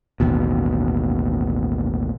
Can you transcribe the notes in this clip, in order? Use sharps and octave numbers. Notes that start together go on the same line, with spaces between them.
A1 D#2 B2